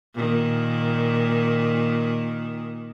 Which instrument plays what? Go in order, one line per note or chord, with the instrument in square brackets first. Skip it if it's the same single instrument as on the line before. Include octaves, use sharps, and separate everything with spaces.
[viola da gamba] A#2 D#3